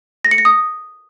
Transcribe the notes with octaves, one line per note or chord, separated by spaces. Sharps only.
A#6
C#7
A#6
D#6